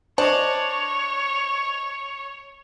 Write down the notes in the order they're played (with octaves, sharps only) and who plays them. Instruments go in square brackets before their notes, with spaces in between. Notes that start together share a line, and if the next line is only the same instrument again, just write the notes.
[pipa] D4 [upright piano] C5 D#5 [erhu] C#5